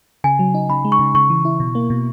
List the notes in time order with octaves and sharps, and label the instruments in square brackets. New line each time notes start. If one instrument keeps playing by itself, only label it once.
[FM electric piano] C#3 [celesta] G#5
[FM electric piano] F#3
D#4
[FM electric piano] C#3 [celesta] B5
[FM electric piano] G#3
[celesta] C#6
[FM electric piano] C#3
[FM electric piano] C#3 [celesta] C#6
[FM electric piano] E3
E4
B2
A#3
B2